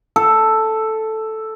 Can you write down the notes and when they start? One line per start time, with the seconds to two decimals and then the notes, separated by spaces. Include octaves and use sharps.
0.16 A4